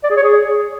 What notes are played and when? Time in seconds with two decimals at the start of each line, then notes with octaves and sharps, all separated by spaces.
0.04 D5
0.10 G#4
0.17 C#5
0.23 G#4